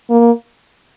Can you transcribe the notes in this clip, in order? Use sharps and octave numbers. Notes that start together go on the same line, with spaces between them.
A#3